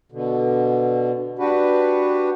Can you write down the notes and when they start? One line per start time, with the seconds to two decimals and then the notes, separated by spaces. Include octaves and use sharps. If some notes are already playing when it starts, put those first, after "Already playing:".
0.12 B2 D3
1.39 D4 F#4 G4 B4